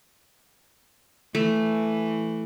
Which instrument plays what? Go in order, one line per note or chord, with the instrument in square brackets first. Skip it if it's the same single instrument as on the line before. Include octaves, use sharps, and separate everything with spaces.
[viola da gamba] E3 [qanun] A3